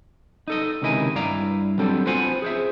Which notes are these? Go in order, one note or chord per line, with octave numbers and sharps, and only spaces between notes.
D#4 A4 D#5
C#2 C3 D#3 E4 D#5 G#5
G2 E4 D5 F5 A#5
F#3 G3 B3 C4 D4 A4
B3 C4 F4 C5 F#5 G#5
G#4 C5 E5